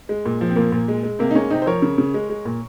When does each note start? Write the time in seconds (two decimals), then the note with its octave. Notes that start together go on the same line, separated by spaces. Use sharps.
0.09 G#3
0.26 A#2
0.41 F3
0.49 C4
0.56 A#2 A#3
0.72 A#2
0.88 G#3
1.03 G#3
1.19 C3 A#3
1.31 D#4
1.35 G#3 A#3 C#4
1.50 C3 C4 D#4
1.62 C5
1.66 F3 A#4 C#5
1.82 C#3
1.98 C#3
2.14 G#3
2.30 G#3
2.45 A#2